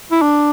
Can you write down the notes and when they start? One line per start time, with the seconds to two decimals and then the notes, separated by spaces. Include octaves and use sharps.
0.11 E4
0.22 D4